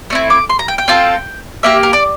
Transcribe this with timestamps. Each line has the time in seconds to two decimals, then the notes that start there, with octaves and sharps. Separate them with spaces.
0.10 A3 C4 E4
0.30 D6
0.49 C6
0.59 A#5
0.68 G5
0.78 G5
0.88 C4 F4 A4
1.63 A#3 E4 G4 E5
1.83 A#4
1.93 D5